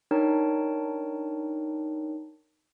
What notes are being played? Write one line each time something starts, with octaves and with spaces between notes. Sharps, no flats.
D4 D#4 A#4 C#5 G5 A5